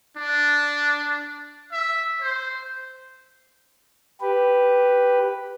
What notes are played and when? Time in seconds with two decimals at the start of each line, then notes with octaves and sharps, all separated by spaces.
0.17 D4
1.72 E5
2.22 C5
4.21 G4 B4